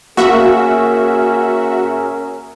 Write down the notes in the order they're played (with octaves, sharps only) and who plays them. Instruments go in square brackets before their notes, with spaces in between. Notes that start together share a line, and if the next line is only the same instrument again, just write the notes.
[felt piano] A#3 F5 C#6 [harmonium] C#4 G#4 A#4 [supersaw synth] F#4 E5